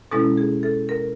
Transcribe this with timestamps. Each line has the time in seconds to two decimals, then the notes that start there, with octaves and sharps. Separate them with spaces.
0.11 B2 G#3 C#4 E4 A4
0.37 G#4
0.63 A4
0.89 A#4